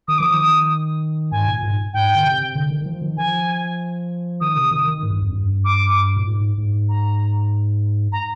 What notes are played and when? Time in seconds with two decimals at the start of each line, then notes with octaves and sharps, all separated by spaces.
0.08 D#3 D#6
0.18 F3 D6
0.29 D#3 D#6
1.32 G#2 G#5
1.47 A#2
1.63 G#2
1.94 G#2 G5
2.15 D3
2.25 C3
2.55 D3
2.70 D#3
2.82 D#3
2.86 F3
3.02 D#3
3.17 F3 G#5
4.41 D#3 D#6
4.56 C3
4.71 D#3
4.88 D#3
5.03 G#2
5.12 G2
5.22 F2
5.31 G2
5.65 D6
6.17 A#2
6.27 G#2
6.58 G#2
6.89 A#5
8.12 A#5